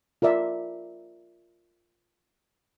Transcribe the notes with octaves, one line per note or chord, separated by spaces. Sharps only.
F4 A#4 D5 E5